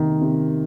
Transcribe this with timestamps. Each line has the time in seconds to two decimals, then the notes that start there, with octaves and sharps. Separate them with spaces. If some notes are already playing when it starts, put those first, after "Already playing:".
Already playing: C3 D#3 A#3
0.21 C3